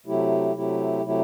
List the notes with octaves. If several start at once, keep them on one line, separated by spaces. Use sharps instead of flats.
C3 F#3 A3 E4 G4
C3 F#3 A3 E4 G4
C3 F#3 A3 E4 G4